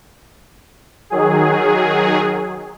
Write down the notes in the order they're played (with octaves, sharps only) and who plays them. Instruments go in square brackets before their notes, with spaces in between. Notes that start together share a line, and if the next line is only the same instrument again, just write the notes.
[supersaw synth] D#3 F#3 G#4